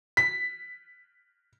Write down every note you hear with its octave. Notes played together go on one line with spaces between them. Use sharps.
B6